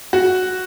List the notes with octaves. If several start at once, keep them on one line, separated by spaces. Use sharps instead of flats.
F#4